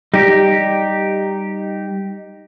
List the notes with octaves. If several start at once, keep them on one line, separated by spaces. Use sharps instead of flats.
G3 D#4 G4